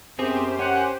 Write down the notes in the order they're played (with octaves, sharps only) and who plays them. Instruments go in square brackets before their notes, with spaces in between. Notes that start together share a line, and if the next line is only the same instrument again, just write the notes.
[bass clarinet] F#2 [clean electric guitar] B3 C4 G#4 [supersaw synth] G4 C5
[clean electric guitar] C#4 [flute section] F#5 G#5